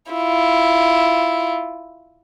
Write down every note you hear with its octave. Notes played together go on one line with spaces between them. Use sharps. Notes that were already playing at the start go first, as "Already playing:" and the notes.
E4 F4